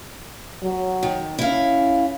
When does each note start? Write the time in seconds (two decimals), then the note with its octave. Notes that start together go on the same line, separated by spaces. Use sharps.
0.62 F#3
1.03 D#3
1.39 C#4 E4 F5